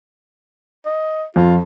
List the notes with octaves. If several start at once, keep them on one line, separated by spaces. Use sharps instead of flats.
D#5
F2 F4